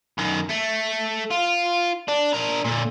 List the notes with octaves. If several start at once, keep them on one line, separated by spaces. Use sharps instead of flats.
F#2 D#3
A3
F4
D4
D4 A#4
A#2 D3